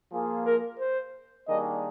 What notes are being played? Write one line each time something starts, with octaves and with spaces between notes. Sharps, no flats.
F3 A#3 F4 G#4
A#4
C5
D#3 G3 A#3 D4 G#4 D#5